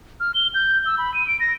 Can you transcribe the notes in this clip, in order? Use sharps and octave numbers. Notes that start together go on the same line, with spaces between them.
F6
G7
G6
E6
B5
D#7
D7
A#6